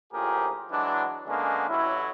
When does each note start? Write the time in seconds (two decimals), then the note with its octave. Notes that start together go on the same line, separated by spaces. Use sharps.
0.12 A#1 A2 F3 G4 G#4 A#4
0.71 E3 F#3 G#3 D4
1.27 D3 G#3 A#3 B3 C#4 D4
1.69 A1 A2 F#3 E4